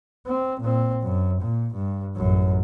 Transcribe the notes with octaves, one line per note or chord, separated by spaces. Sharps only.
C4
A#2 C4
F#2
A#2
G2
A1 F#2